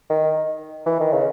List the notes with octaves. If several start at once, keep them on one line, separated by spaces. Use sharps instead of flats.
D#3
E3
D#3
C#3